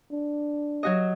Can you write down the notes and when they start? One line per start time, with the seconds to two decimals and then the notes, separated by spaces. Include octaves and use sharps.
0.12 D4
0.83 F#3 F#4 D#5